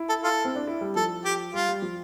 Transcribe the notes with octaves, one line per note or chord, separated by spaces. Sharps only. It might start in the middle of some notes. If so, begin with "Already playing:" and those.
Already playing: E4
A4
F4 A4
C4
D4
E4
G3
F3 A4
G4
G3 F4
G3
F3